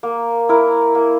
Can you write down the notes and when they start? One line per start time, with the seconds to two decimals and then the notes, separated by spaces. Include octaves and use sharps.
0.03 A#3
0.49 E4 A#4
0.95 A#3